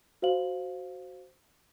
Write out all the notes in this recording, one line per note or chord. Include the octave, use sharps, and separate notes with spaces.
F#4 C5 F5 F#7